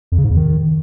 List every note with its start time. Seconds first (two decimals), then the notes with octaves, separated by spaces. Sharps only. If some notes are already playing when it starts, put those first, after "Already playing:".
0.12 F2
0.18 C#3
0.24 G#2
0.30 E2
0.37 D#3